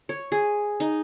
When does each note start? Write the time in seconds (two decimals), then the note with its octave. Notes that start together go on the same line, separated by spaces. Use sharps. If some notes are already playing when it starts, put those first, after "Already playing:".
0.09 C#5
0.32 G#4
0.80 D#4